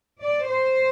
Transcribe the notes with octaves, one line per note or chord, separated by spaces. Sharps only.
D5
C5